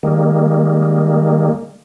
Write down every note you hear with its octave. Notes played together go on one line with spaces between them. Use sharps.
D#3 G3 G#3 A#3